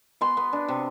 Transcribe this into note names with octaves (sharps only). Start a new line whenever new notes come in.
B3 C6
B3
D4
C3